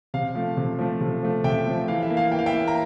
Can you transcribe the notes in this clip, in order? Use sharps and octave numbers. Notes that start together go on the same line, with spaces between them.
C3 F5
F3 A3
C3
F3 A3
C3
F3 A3
C3 E5 G5
F3 A3
E3 F5
E5
A#3
F5
E3 G5
F5
E5 G5
A#3
A#5